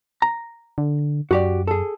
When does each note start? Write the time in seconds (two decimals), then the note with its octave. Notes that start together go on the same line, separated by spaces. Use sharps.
0.22 A#5
0.78 D3
1.31 F#2 F#4 G4 D5
1.67 G#4 A4